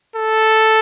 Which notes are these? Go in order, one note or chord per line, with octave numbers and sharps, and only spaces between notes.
A4